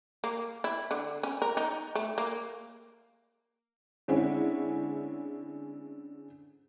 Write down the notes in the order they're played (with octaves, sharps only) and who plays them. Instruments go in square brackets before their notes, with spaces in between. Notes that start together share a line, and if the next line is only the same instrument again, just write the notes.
[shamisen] A#3
E4
D3
C#4
A#4
D#4
A3
A#3
[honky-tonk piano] D3 G#3 C4 C#4 E4